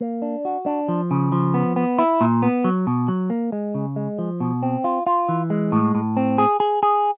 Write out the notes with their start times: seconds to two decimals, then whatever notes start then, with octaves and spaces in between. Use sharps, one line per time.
0.01 A#3
0.22 D4
0.45 F#4
0.66 D4
0.88 F3
1.11 C#3
1.32 F3
1.54 B3
1.76 B3
1.99 E4
2.21 A#2
2.42 B3
2.64 F#3
2.87 B2
3.08 F#3
3.30 A#3
3.52 G#3
3.74 C#3
3.96 G#3
4.19 F3
4.40 B2
4.63 C4
4.84 F4
5.07 F4
5.29 E3
5.50 G#3
5.72 A2
5.95 A2
6.17 C4
6.38 G#4
6.60 G#4
6.83 G#4